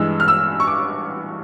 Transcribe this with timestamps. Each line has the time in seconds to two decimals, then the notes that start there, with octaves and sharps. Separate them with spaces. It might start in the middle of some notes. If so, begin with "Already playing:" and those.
Already playing: G2 E3 G#3 E6
0.20 F6
0.28 E6
0.60 C#6
0.67 D6